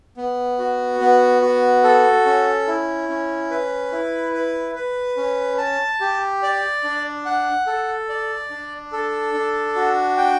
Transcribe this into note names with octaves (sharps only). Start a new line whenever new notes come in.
B3
F#4
B3
F#4
A4
C#4
E4
C#4
B4
E4
B4
B4
C#4
A5
G4
D5
D4
F#5
A4
D5
D4
A4
D4
F#4
G5